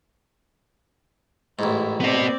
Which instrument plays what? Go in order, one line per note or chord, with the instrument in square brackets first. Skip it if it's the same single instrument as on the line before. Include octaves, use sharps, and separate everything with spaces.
[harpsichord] A1 G#2 [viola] E4
[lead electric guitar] B3 D#5 [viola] C4 D5